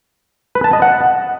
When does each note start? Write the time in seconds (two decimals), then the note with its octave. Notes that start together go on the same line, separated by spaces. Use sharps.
0.55 B4
0.64 A5
0.73 D#5
0.82 F#5